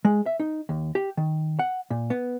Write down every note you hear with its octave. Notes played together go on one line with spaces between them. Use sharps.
G#3
E5
D#4
D#2
G4
D#3
F#5
A#2
B3